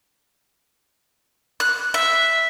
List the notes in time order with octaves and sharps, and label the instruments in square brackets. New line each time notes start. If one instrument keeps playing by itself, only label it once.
[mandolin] F#6
E5